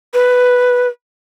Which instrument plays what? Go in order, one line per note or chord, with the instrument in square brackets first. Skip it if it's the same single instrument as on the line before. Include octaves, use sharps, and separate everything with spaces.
[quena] B4